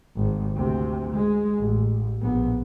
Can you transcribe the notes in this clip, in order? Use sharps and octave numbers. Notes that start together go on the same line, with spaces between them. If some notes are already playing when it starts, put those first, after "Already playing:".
G#1
D2 C3
G#3
A1
A#1 B3